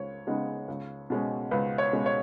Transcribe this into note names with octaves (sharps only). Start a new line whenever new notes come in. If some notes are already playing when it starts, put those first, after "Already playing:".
Already playing: C#2 C#5
C#3 G#3 B3 D#4
C#2
B2 G#3 C#4
C#2 B4
C#5
B2 G#3 C#4
C#5